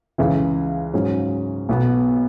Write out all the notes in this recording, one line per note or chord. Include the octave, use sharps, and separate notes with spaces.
C#2 C#3 E3
G#2 F#3 C#4 F#4
B1 B2 B3